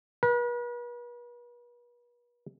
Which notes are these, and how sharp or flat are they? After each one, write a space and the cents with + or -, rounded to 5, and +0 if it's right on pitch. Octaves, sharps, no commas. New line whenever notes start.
B4 -40